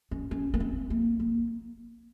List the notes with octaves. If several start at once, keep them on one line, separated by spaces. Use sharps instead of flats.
C#4
C#4
A#3
C4
A#3
A#3